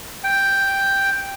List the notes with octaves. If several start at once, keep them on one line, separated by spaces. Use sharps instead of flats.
G5